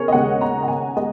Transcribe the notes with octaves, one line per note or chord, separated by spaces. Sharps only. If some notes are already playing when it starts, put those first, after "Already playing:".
Already playing: C#3 G#4 A#4 C#5
D#5
D#2 C#3 G#3 F#5
A#5
F#5
G#5
G#3 D#5